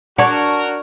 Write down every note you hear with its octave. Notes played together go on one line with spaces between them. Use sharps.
D4 F#4 A#4 C#5 F#5 C#6